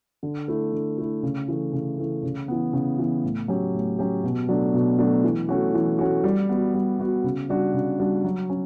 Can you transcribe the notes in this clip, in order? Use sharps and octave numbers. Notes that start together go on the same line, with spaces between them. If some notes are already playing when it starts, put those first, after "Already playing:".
D3
A3 E4
D3
A3 E4
C#3
E3 A3
C#3
E3 A3
C#3
E3 B3
C#3
E3 B3
A2
F#3 C#4 G4
A2
F#3 C#4 G4
B2
F#3 A3 D4
B2
F#3 A3 D4
E3
A3 C#4 F#4
E3
A3 C#4 F#4
G3
B3 F#4
G3
B3 F#4
C#3
G3 D4 F#4
C#3
G3 D4 F#4
F#3
C#4 F#4